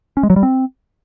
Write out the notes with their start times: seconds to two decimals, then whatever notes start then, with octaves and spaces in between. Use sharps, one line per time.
0.17 C#4
0.23 G#3
0.30 F#3
0.36 G3
0.43 C4